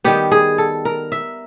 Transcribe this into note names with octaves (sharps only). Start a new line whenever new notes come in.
D#3 G3 B3 G4
G#4
A4
A#4
E5